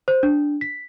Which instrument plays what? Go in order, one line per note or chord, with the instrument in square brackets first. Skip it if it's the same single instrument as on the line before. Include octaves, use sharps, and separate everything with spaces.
[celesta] C5
D4
B6